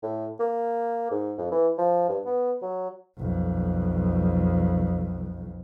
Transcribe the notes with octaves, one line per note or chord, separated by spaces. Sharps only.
A2
A#3
G#2
F2
E3
F3
G2
B3
F#3
B1 F2